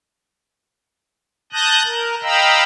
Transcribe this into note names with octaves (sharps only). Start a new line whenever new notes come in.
A5 D#6 F#6 G6 A#6
A#4
D#5 F5 G5 A#5 B5 E6